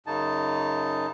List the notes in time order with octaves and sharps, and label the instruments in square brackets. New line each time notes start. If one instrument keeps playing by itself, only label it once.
[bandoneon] F#2 C#3 D#4 A5